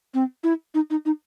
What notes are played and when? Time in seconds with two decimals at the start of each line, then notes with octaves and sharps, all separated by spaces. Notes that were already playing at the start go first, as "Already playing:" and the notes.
0.14 C4
0.44 E4
0.74 D#4
0.90 D#4
1.06 D#4